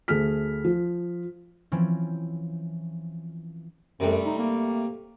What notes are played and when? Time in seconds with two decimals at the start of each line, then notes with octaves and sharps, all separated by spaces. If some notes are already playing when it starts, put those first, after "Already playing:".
0.08 D2 A3 G#4 F6 B6
0.65 F3
1.72 E3 F3 C4 C#4
4.00 F#2 C3 G3 A3
4.25 D#4
4.38 A#3